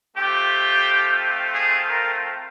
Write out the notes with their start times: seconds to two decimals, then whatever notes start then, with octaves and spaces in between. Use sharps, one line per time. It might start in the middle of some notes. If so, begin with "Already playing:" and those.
0.16 A3 C4 F4 G4
1.52 G#4
1.87 A#4